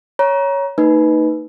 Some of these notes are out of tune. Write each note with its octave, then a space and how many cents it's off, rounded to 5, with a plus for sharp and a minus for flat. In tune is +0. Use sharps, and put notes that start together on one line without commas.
C#5 +5 A#5 +25
A#3 -45 D#4 +0 B4 +0